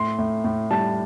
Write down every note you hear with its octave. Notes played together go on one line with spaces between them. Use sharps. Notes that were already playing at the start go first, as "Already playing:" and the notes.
Already playing: A2 C6
A2
A2
G3 A5